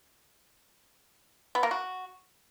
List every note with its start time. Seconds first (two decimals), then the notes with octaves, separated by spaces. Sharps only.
1.55 B3
1.63 A#3
1.71 F#4